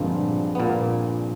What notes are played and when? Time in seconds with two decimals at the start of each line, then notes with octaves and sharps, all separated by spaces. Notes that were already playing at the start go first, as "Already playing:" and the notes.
Already playing: G2 A#2 D3 F3 G#3 A#3 C4
0.55 B3
0.60 A#2 A#3